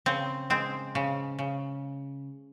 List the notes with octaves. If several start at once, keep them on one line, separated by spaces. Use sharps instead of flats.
C#3 C4
G#3 C4
C#3
C#3